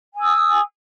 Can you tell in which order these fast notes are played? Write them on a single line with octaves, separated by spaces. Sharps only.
G#5 D#6 E6